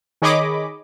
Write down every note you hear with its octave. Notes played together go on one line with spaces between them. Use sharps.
D#3 G#4 C#5 D#5 B5 D6